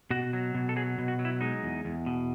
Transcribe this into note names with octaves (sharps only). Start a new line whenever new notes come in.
B2 F#4
F#3
B2
A4
F#3 G#4
B2
F#4
F#3
E4
G#3 D#4
E2
E2
B2